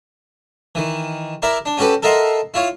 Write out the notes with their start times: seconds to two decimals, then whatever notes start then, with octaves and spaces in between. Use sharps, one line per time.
0.75 D#3 E3
1.42 E4 A#4 D5 E5
1.66 D4
1.77 C#4 F#4 G4 A4 B4
2.03 A4 A#4 D#5 E5 F#5 C6
2.54 E4 F4 C#5